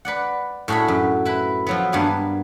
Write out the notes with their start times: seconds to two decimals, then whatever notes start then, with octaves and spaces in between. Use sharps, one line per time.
0.05 B4 D5 F#5
0.68 A2 F#4 G#4 E5 B5
0.88 F#2
1.25 E4 B4
1.67 F3 F#3 B3
1.92 G2 A#3 B3 G#5